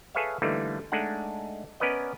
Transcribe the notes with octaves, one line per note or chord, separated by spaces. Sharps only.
G#4 A4 B4 C#5 E5 F5
D3 E3 G3 A3 A#3 D#4
G#3 A3 D4 D#4 F#5
B3 C#4 A#4 B4 D5 D#5